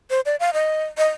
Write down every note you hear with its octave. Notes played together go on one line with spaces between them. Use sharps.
C5
D5
F5
D#5
D#5